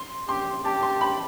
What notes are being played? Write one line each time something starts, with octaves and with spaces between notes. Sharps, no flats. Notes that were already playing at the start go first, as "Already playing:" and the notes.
Already playing: C6
G4 C6
G4 A5
C6
B5